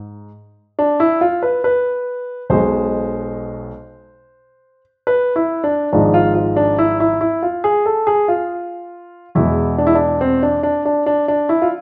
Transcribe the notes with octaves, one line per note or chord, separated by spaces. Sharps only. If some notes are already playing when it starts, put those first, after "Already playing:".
Already playing: G#2
D4
E4
F4
B4
B4
B1 B2 G#3 C5
B4
E4
D4
G#1 G#2 F3 G#3 D4
F4
F4
D4
E4
E4
E4
F4
G#4
A4
G#4
F4
E2 B2 G#3 E4
D4
E4
D4
C4
D4
D4
D4
D4
D4
E4
F4